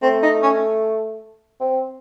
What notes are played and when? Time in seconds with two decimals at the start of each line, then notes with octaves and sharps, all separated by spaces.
0.02 A3 C4
0.23 D#4
0.43 C#4
1.60 C4